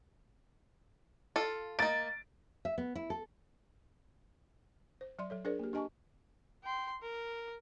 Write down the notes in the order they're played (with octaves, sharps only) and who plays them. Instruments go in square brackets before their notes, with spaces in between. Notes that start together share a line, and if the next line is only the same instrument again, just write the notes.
[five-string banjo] F4 A4
[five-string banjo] A#3 D#4 [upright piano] A6 D7
[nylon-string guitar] E5
B3
E4
A4
[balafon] C5
F#3 D5 E5 C6
F#3 A4 C#5
D4 G#4 A#4 C5 D5
A#3 G4
D4 G4 D#5 G#5 A5 C#6
[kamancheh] G5 C6
A#4